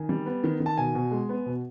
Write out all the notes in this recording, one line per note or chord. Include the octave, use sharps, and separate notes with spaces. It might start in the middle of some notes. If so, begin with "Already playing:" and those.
Already playing: D#3 G#5
G3
B3
D#3
D#3
A5
B2 G#5
B2
G#3
B3
B2